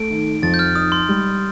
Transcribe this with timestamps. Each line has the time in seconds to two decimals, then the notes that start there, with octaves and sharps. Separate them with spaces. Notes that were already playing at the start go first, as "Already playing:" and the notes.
Already playing: A3 D7
0.10 D#3
0.42 F2 A6
0.54 G6
0.59 F6
0.75 D#4 D#6
0.92 C6
1.09 G3